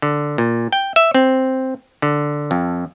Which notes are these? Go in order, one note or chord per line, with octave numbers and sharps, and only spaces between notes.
D3
A#2
G5
E5
C4
D3
F2